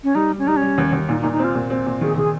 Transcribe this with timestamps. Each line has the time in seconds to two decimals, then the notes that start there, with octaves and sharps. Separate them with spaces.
0.04 C#4
0.15 G3 D#4
0.31 G3
0.39 C#4
0.46 G3 D#4
0.57 C#4
0.62 G3
0.78 D#2
0.93 D#2
1.09 A#2 D#4
1.21 D#4
1.24 A#2
1.32 D#4
1.39 C4 F4
1.55 A#2
1.70 C4
1.86 A#2
2.01 D#3 G#4
2.18 D#3 G#4